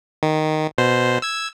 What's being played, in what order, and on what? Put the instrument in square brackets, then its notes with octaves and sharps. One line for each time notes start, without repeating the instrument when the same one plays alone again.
[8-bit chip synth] D#3
B2 C5
E6 G#6